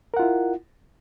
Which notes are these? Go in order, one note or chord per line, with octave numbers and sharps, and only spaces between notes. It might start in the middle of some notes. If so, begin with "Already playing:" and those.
E4 F4 A#4 F#5